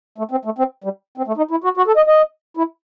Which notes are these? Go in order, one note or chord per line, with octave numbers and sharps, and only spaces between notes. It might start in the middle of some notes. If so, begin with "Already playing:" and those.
A3
C4
A3
C4
G3
C4
A3
D#4
E4
F#4
F#4
A4
D#5
D#5
E4